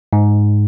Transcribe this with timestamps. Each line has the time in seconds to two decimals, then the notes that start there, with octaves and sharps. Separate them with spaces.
0.13 G#2